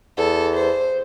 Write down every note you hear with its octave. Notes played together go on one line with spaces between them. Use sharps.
E2 A4
C5